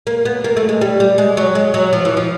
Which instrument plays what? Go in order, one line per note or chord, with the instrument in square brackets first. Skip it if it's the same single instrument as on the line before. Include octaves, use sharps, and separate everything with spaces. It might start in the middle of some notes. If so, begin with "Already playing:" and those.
[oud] A#3
B3
A#3
A3
G#3
G3
G3
G#3
F#3
G#3
F#3
F3
E3
F3